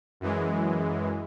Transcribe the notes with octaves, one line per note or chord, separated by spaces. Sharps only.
F#2 E3 G#3